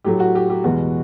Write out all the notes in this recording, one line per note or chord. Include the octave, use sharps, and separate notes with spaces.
A2 F#3 A3 G4
F#4
G4
G4
E2 B2 G#3 F#4